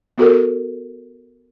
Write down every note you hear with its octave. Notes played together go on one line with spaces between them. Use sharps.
B3 F#4 A4 A#4